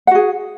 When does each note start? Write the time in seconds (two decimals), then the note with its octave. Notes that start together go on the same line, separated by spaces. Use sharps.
0.07 F#5
0.11 F#4
0.15 G#4